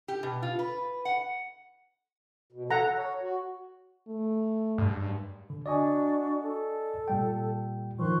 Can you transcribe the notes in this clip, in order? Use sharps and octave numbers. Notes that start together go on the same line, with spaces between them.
G4
B2
F4
B4
F#5
B2
A4 F#5 A#5
C#5
F#4
A3
G2
D3
D4 F#4 D5 D#5 G#5 C#6
A4
A#2 G3 G5
D#3 F3 C6 C#6 F#6